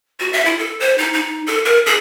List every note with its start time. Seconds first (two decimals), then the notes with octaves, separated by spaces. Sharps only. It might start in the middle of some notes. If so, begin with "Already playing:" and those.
0.20 F#4
0.33 E5
0.45 E4
0.59 A4
0.80 C5
0.98 D#4
1.13 D#4
1.47 A4
1.65 A#4
1.86 G#4